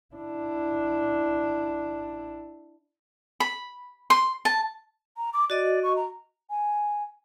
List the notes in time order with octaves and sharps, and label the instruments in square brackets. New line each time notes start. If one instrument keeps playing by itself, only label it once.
[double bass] D4 E4
[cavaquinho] B5
C6
A5
[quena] A#5
D6
[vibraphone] F#4 D#5 [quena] D5
[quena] C#6
A#5
[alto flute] G#5